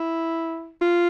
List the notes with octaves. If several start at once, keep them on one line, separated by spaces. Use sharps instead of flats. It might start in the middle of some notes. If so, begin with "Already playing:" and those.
Already playing: E4
F4